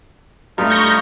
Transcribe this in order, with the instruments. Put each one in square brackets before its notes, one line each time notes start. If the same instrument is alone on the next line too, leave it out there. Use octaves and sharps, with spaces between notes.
[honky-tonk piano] G2 A3 [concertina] D#4 F4 F6
[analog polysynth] C#6 G6 A#6